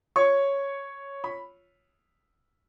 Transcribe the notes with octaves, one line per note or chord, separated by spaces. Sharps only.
C#5 C#6
B5